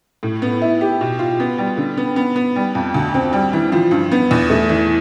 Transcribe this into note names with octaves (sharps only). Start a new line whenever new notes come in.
A2
B3
E4
G4
B2
F4
B3
G3
D3
B3
B3
B3
G3
F2
D2
C4
G3
E3
F3
G2
B3
E2
A3
E3